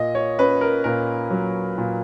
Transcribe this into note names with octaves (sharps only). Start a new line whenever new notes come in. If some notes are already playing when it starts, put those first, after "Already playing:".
Already playing: A#2 D#5
C#5
C#4 B4
A#4
A#2 A#4
F#3
A#2